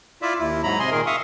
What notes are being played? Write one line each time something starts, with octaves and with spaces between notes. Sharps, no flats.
E4 F4 D5 E5
D#2 E4
G#2 F#3 A#5 B5
C3 D#5 G#5 C6
A#2 D#3 G#4 A#4
E5 F5 C#6 D#6